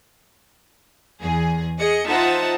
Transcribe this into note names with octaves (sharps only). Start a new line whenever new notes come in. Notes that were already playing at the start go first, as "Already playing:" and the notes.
E2 G#4
G#4 D#5 C#7
D#4 F4 C5 E5 F#5 A5